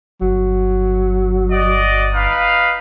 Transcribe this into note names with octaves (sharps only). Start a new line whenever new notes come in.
G1 F#3
F#4 D5 D#5
D#4 B4 F5